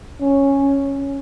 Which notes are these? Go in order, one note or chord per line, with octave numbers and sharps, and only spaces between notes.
C#4